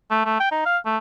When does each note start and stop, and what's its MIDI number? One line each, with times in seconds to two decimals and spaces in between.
0.11 0.22 57
0.26 0.39 57
0.40 0.52 79
0.52 0.62 63
0.66 0.78 77
0.86 0.98 57